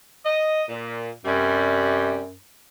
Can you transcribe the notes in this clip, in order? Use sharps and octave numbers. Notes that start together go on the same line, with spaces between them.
D#5
A#2
F#2 C3 G3